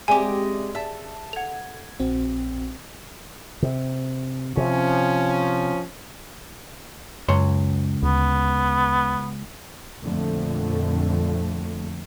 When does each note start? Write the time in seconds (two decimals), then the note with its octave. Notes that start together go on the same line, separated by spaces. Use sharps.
0.08 G#3 C4 G4 D5 E5 G#5
0.75 G#4 E5 A5
1.33 A4 F#5 G#6 F7
2.00 A#1 C4 F#4
3.63 C3
4.57 C3 F3 C#4
7.29 C#2 F#2 C#5 C6
8.03 D2 B3
10.05 F2 A#2 D3 F3 A3